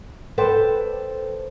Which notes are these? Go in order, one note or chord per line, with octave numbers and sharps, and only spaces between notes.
A4 B4 C5 D5 G5